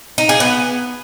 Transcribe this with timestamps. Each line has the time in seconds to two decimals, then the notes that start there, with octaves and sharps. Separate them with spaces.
0.18 D#4
0.29 G#4
0.40 B3